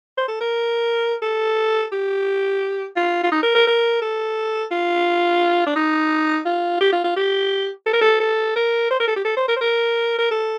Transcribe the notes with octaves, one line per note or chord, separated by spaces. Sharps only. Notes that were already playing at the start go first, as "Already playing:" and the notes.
C5
A4
A#4
A4
G4
F4
F4
D#4
A#4
A#4
A#4
A4
F4
D4
D#4
F4
G4
F4
F4
G4
A4
A#4
A4
A4
A#4
C5
A#4
A4
G4
A4
C5
A#4
C5
A#4
A#4
A4